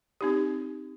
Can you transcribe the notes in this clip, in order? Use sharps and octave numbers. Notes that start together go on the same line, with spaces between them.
C4 D#4 G4